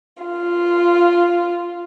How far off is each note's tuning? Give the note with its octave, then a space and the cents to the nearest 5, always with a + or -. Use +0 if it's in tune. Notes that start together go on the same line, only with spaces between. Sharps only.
F4 -5